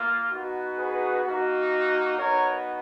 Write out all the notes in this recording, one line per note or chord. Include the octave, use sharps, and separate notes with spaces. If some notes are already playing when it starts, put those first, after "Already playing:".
Already playing: A#3 F4
B3 D#4 F#4
G#4 B4
A#3 D#4 F#4
B3 D#4 F#4 A#4 C#5